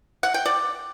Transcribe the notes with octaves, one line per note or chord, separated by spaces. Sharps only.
F#5
G5
D5